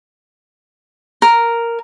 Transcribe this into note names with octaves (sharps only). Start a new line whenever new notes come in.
A#4